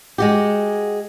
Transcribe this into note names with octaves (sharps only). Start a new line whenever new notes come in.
G#3 F#4 G4